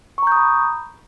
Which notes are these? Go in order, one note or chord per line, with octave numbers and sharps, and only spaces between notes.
A#5 B5 C#6 D#6 G6